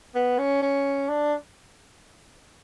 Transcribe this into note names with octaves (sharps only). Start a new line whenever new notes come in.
B3
C#4
C#4
D4